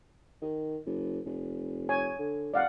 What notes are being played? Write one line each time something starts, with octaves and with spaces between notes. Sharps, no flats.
D#3
F#1
F1
C#5 G#5
D3
F1 D5 F5 F#5